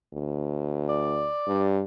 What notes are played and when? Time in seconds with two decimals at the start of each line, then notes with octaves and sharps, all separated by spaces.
0.14 D2
0.89 D5
1.47 G2